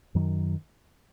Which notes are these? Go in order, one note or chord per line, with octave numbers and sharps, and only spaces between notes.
F#2 D#3 F#3